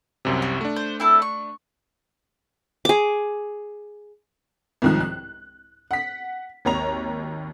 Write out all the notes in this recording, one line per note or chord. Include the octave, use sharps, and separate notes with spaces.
C2 F#2 C3
F#4
A3 D4
C5
C4 E4 A4
C#6
G#4 D6
C2 G#2 D#3 F3 F#6
F#6
F#5 B6
G#1 D#2 C#5 A#5 F7